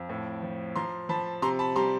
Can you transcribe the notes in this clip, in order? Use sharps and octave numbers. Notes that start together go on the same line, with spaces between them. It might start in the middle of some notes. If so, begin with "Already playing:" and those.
Already playing: F2
A2
F3
F3 A#5 C6
F3 A5 B5
C3 A#5 C6
A5 B5
G3 A#5 C6